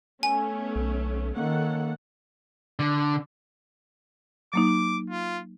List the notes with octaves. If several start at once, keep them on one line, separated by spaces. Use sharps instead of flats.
A3 B3 C#4 G#5
B1
D#3 A#3 C#4 A4 F#5
D3
F#3 A#3 D#4 D6
F4